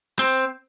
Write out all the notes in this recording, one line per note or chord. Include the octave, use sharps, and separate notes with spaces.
C4